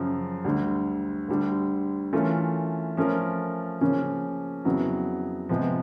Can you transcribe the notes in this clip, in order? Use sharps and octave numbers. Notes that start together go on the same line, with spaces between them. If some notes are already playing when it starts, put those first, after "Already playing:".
Already playing: F#2 C#3 F3
D2 D3 G3
D2 D3 G3
E3 A3 C#4 F4 A#4
F3 A3 C#4 F4 A#4
C#3 F3 A#3 C#4
F2 C#3 F#3 B3 E4
C3 F3 G#3 B3